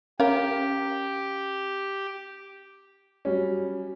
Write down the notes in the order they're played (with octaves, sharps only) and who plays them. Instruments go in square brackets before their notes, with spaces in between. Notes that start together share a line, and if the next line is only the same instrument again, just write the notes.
[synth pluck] C#4 [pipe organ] G4 [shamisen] A#4 F5
[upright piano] F#3 G3 C#4